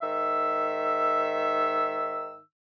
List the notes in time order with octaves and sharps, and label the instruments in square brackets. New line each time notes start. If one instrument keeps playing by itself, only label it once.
[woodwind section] G#2 D#3 E5 E6